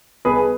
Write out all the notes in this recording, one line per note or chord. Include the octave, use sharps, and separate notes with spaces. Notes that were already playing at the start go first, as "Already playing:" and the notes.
B1 G#4 B4